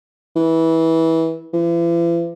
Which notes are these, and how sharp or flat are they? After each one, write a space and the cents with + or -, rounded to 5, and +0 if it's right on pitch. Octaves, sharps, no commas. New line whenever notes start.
E3 -20
E3 +45